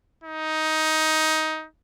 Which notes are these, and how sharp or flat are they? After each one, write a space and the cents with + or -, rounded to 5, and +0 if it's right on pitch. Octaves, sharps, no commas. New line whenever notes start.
D#4 +15